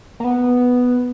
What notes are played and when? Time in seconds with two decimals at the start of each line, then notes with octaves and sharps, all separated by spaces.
0.20 A#3
0.24 B3